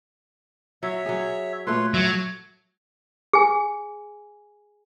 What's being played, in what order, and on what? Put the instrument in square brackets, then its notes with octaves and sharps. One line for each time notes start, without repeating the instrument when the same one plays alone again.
[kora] F#3 [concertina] C#5 E5
[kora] F#3 G#4
[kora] A#2 A3 [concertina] B4 C#5 C6
[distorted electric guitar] F#3 [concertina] E5
[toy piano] G#4 G#5